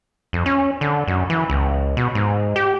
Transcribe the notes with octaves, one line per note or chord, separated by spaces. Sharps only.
F2
C#4
D3
F#2
E3
C#2
B2
G#2
G4